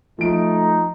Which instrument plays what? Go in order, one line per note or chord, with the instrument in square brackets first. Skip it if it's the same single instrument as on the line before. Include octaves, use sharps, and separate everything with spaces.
[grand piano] F3 D7 [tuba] A3 [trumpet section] D#4